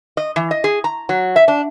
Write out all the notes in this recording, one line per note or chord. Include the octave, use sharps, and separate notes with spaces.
D#5
E3
D#5
G#4
A#5
F#3
E5
D4